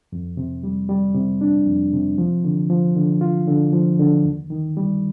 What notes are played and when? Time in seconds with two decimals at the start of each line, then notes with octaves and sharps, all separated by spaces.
0.12 F2
0.37 C3
0.63 G3
0.89 G3
1.15 C3
1.41 D4
1.66 F2
1.93 C3
2.18 F3
2.44 D3
2.70 F3
2.96 D3
3.21 F4
3.47 D3
3.73 F3
3.99 D3
4.25 D#2
4.50 D#3
4.77 G3